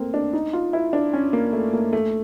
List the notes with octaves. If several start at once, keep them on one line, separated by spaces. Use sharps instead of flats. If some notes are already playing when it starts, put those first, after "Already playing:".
Already playing: A3 A#3 C4
D4
D#4
F4
E4
D4
C#4
A#3
A3
A#3
A3